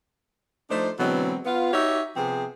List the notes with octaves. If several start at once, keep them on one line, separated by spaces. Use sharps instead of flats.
F3 A3 D4 D#4 C5
B2 D3 E3 F#3 G#3 C4
B3 F4
D#4 F#4 G4 C#5 E5
C3 F3 B3 C4 G#4